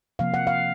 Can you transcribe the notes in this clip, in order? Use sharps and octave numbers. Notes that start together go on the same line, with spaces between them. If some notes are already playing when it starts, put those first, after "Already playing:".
C3 F3 A#3 F5
F#5
F5